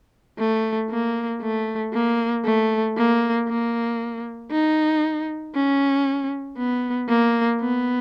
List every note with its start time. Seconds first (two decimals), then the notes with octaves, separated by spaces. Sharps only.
0.39 A3
0.91 A#3
1.42 A3
1.93 A#3
2.45 A3
2.97 A#3
3.48 A#3
4.51 D#4
5.54 C#4
6.57 B3
7.09 A#3
7.60 B3